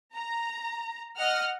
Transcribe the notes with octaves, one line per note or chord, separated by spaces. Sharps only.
A#5
D#5 F#5 F6